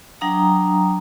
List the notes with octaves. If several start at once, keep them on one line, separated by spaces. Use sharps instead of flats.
F#3 D4 F5 G5 A#5 D#6